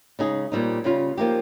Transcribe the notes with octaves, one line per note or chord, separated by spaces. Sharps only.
C#3 G#3 D#4 G#4
A#2 G3 C4 D#4
C#3 G3 C#4 F4
F3 A#3 D#4 G4